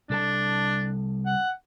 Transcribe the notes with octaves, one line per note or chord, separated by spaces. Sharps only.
C2 D4 A4 A5
F#5